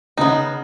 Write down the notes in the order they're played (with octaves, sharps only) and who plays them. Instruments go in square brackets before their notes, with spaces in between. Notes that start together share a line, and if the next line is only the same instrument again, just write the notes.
[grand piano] C#3 [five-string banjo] B3 D#4